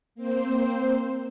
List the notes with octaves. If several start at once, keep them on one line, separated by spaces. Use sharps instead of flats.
A#3 C4 C5